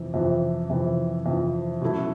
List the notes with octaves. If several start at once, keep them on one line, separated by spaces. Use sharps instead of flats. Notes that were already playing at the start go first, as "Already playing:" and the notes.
Already playing: F2 C3 E3
F2 C3 E3
F2 C3 E3
F2 C3 E3
B2 F#3 A3 C#4 E4